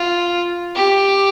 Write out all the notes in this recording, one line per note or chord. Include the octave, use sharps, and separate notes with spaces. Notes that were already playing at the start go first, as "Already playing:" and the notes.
Already playing: F4
G4